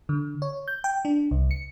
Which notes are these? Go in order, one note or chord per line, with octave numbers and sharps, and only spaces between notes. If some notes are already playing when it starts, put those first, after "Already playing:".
D3
C#5
G6
G5
D4
C2
C#7